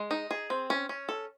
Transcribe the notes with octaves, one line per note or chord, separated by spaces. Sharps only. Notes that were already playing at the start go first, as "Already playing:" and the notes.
Already playing: G#3
D#4
G#4
C4
C#4
C#4
A4